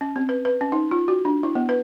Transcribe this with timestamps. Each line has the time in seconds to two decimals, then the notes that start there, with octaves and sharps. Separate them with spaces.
0.01 C#4
0.16 C4
0.29 B4
0.45 B4
0.61 C#4
0.72 D#4
0.91 F4
1.08 F#4
1.25 D4
1.43 E4
1.55 B3
1.69 B4